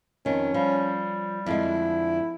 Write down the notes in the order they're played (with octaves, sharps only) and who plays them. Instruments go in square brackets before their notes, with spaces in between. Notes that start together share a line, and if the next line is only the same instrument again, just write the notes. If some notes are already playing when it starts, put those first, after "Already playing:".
[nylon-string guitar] F2 D#3 [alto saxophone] C#4
[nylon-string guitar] F3 [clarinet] G3
[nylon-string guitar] F2 D3 G#3 [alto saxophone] E4